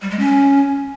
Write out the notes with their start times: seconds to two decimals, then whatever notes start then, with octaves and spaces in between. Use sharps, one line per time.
0.02 G3
0.11 G#3
0.19 C#4